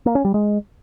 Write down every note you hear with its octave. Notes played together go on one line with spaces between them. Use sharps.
A#3
C#4
G3
G#3